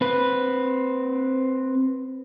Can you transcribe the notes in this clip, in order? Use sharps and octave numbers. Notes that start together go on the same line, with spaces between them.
C4 B4